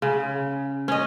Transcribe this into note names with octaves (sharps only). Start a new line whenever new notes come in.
C#3
C#4 D#5